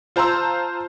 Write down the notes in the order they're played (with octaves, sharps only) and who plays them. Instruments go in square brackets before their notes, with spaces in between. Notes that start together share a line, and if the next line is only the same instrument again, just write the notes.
[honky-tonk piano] F4 C5 A5 A#5 C6 E6